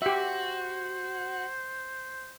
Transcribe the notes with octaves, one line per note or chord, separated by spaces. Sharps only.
F#4 G4 C5 E5